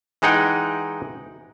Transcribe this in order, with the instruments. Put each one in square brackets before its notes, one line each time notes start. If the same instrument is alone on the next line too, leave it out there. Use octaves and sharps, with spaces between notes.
[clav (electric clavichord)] E3 G#3 D#4 F#5 G5